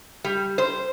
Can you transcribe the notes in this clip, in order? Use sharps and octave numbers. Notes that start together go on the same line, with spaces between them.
G3
C5